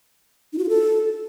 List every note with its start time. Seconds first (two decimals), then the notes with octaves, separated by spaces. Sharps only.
0.53 D#4
0.58 F#4
0.64 F4
0.69 A4